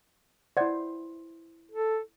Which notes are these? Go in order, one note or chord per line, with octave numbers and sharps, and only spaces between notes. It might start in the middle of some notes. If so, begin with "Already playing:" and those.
E4 C5 D5 F#5 G#6
A4